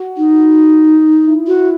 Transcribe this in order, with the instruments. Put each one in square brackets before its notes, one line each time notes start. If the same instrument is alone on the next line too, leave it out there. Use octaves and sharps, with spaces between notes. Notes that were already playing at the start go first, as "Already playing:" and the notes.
Already playing: [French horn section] F#4
[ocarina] D#4
[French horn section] E4
[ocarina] F#4